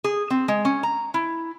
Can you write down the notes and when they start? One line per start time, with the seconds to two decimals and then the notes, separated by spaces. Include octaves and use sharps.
0.04 G#4
0.30 C4
0.48 G#3
0.65 C#4
0.83 A#5
1.14 E4